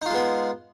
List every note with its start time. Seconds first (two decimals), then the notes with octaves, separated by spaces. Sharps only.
0.02 D#4
0.06 F4
0.10 G#3
0.14 B3